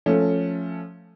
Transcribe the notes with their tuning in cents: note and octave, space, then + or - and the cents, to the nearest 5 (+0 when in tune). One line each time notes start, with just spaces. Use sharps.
F3 +0 A3 +0 C#4 +0